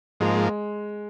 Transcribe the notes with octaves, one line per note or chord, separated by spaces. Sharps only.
G#2 F3 G#3 A#3